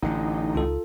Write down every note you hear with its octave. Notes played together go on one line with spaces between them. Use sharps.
A1 D3 D#4
C#2 F4 A4